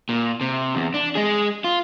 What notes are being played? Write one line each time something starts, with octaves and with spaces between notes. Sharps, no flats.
A#2
C3
E2
D4
G#3 G#4
F4